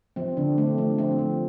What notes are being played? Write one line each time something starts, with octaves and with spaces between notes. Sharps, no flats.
F3 C4
D3 D4
A3 C4
F3 C4
F3 C4
F3